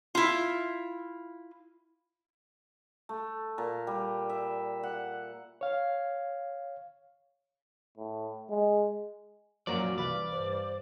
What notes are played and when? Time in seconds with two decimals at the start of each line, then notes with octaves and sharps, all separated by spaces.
0.15 E4 F4
3.09 A3
3.58 A#2
3.87 G3
4.29 E5
4.83 F#5
5.61 C#5 F5
7.98 A2
8.50 G#3
9.67 F#2 A#2 F3 A#3 F#4 D5
9.98 C2 E3 B4 D5 F5
10.32 G2 C5